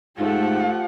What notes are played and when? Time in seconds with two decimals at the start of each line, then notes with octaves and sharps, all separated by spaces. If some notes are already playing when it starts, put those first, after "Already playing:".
0.19 G#2 A3 F4 G4 C5 F#5